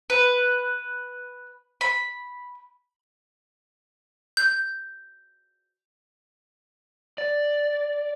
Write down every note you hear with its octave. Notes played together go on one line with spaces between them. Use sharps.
B4
B5
G6
D5